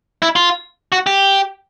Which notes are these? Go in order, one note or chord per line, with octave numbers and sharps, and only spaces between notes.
E4
F4
F#4
G4